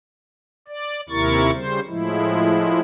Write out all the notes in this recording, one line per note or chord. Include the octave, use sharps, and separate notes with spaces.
D5
D#2 C3 E4 A#4 C#6 A6
C#3 G3 C5
A2 F3 G#3 E4